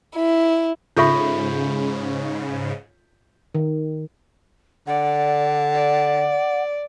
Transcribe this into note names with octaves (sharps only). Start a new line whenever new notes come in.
E4
G#2 C#3 F4 A4 E5 B5 C#6 G6
D#3
D3 D5 F#5
D5